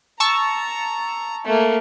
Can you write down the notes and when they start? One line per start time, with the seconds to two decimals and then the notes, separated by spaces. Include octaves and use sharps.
0.20 A5 A#5 C#6 E6
1.46 A3 A#3